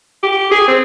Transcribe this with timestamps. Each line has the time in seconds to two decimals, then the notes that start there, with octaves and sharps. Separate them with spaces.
0.23 G4
0.51 G#4
0.68 C4